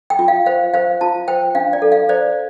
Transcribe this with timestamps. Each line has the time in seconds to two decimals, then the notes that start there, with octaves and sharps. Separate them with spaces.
0.10 G5
0.19 F4
0.28 F5
0.46 C5 F5
0.74 C5 F5
1.01 F4 A5
1.28 C5 G5
1.55 D4 F5
1.73 D5
1.82 A4
1.92 F5
2.09 C5 D5